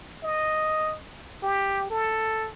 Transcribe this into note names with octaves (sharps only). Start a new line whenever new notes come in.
D#5
G4
A4